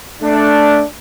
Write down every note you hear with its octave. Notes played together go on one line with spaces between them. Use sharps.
A3 D4